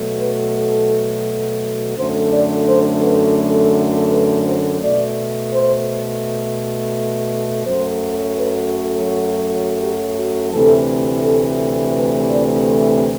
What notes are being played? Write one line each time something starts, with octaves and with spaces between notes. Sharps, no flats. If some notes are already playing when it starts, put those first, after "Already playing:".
Already playing: B2 F#3 A3
B4
A4
F#2 D3 A3 C5
D5
C5
B4
A4
B4
C5
B2 A3 D5
C5
F#2 F#3 A3 C5
B4
A4
F#4
G4
F#4
D2 C3 E3 A3 A4
A4
B4
D5
C5